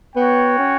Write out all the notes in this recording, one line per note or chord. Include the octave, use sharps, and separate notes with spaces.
B3 F#4 C#5 G5
C#4